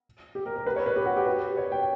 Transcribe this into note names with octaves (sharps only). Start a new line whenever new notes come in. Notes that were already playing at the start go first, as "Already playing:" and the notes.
G4
A#4
A#4
B4
C#5
B4
G4
F#4
G4
B4
C#5
G5